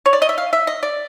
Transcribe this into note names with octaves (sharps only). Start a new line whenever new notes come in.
C#5
D5
D#5
E5
F5
E5
D#5
D5